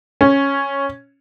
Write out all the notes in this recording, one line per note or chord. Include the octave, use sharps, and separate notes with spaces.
C#4